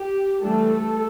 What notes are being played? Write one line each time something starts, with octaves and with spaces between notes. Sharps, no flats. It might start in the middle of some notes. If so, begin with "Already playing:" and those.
Already playing: G4
E3 G3 A3 D4 A4